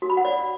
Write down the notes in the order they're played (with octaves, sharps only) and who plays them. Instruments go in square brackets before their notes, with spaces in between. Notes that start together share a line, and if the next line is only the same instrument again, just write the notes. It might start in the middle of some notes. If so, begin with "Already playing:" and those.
[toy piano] F#4
B5
F#5
D5